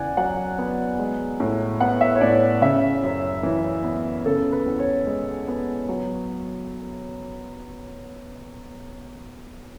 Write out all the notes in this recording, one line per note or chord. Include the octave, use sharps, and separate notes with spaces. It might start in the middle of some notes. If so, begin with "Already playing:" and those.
Already playing: E2 C#3 D5 F#5 G#5
F#3 F#5
B3
G#3
A2
B3 F#5
E5
C#5
A2 D5
C#3 E5
F#2
E3
B3
C#3 A4
B4
E2
C#5
G#3
B3
F#3